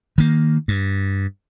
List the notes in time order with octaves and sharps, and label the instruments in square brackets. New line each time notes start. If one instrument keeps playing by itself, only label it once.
[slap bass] D#3 A#3
G2